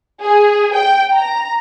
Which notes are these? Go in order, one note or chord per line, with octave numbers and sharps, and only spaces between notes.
G#4
G5
A#5